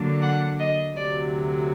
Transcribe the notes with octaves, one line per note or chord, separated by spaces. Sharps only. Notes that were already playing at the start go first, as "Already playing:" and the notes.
Already playing: D3 F#3 A#3 D4
F#5
D#5
D2 C3 F#3 D5